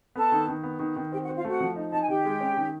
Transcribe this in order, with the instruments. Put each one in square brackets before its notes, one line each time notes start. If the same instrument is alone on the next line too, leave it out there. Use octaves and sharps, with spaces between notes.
[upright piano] B3 [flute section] A4 A5
[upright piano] D#3
D#3
B3
D#3
D#3
[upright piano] C4 [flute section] G4 G5
[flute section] F#4 F#5
[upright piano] C4
[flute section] F4 F5
[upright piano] A3 [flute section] F#4 F#5
[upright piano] F3
D#4
[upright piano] D#4 [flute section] A5
[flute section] G#5
[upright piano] D#3 [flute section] G4 G5
[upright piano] G#3
C#4
D#3